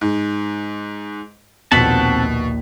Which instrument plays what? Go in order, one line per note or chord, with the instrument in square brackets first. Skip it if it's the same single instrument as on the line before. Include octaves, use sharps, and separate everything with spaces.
[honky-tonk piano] G#2
[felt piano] A#1 D#2 [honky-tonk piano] B2 B6 [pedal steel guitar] C4 F#5 A5